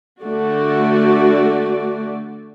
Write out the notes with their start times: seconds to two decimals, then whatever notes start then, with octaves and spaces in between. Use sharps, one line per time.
0.22 D3 A3 F#4 D5